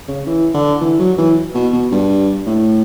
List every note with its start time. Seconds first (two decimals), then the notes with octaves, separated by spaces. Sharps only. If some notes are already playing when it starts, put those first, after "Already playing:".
0.08 C#3
0.26 E3
0.54 D3
0.81 E3
1.00 F#3
1.18 E3
1.55 B2
1.73 B2
1.92 G2
2.46 A2